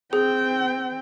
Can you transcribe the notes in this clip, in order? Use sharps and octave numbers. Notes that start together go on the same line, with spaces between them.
C4 G#4 G5